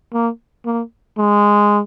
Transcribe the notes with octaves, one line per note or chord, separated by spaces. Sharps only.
A#3
A#3
G#3